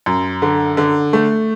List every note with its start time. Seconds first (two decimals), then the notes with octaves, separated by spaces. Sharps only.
0.06 F#2
0.42 D3
0.77 D3
1.13 A3